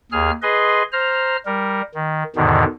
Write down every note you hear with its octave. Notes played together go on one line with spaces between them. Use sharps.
D#2 G#4 F6
G#4 B4 D#5 C6
C5 A#5 F6
G3 A#4
D#3
E2 G#2 B2 D3 D#3